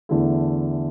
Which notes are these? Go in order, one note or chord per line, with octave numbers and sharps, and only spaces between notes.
E2 D3 A3 E4